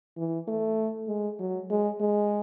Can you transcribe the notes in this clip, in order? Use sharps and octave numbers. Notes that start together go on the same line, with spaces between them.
E3
A3
G#3
F#3
G#3
G#3